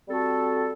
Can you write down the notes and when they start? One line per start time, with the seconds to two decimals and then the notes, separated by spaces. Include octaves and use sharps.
0.08 G3 C4 F#4 A4